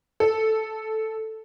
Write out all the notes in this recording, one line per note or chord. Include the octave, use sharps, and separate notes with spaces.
A4